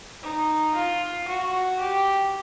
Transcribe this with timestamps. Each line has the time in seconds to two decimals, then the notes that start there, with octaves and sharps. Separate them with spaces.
0.23 D#4
0.75 F4
1.28 F#4
1.80 G4